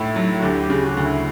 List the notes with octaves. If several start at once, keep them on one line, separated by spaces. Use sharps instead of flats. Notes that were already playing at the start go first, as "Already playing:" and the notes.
Already playing: A2 A3 E4
F#3
F#4
D2 G4
G4
C#3
F#4
D2
E4